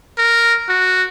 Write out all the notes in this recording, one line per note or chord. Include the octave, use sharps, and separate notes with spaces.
A#4
F#4